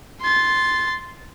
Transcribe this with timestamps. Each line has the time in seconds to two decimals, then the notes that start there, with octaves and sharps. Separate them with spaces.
0.22 C6 A6